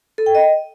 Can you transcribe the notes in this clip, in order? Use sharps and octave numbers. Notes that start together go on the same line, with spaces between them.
A4
G5
D#5